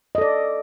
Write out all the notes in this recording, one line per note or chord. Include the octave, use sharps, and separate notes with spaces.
A4 D5 D#5